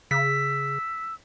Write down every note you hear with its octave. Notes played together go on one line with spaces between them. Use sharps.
C#3 E6 B6